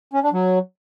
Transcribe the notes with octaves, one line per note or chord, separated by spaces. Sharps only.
C#4
D4
F#3